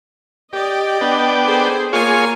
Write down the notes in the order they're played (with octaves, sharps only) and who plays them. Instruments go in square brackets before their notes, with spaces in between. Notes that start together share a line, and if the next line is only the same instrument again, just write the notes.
[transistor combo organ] G4 [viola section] D5 D#5
[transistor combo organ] B3 D4 G5
[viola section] G#4 A4 C5
[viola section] A#3 G#5 A#5 [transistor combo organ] F4 G#4 C#5